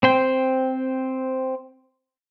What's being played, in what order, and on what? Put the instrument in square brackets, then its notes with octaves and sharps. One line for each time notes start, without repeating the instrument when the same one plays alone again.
[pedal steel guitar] C4 C5 G5